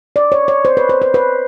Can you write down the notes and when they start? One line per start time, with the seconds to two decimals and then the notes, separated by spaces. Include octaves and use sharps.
0.16 D5
0.32 C#5
0.48 C#5
0.65 C5
0.77 B4
0.89 C5
1.02 C5
1.14 B4